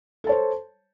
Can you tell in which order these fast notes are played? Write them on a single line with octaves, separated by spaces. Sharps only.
A4 A5 C#5 C5